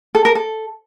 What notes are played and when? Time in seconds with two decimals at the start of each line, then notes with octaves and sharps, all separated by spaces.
0.15 A4
0.25 A#4
0.35 A4